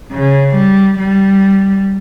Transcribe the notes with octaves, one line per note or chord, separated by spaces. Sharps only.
C#3
G3
G3